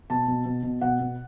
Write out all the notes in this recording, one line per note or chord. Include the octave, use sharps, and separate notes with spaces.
B2 A5
B2
B2
B2
B2 F#5
B2